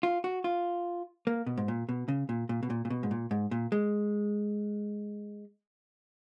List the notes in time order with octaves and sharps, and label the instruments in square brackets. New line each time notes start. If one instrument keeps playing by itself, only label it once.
[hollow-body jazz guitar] F4
F#4
F4
A#3
B2
G#2
A#2
B2
C#3
A#2
A#2
B2
A#2
A#2
B2
G#2
A#2
G#2
A#2
G#3